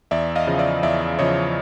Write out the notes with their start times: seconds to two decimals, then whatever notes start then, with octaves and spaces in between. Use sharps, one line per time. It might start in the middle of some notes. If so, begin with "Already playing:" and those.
0.11 E2 D5 E5
0.36 D#5 F5
0.47 C#3 F3
0.59 D5 E5
0.83 E2 D5 E5
1.19 C#3 F3 C#5 D#5